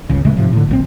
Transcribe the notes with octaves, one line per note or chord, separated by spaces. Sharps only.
G1 C#2 C#3
D1 C#3 G#3 A3
G#2 C3 F3
A2 D3
A#1 E3 C4